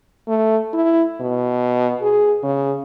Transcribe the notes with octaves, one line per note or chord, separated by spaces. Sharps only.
A3
E4
B2
G#4
C#3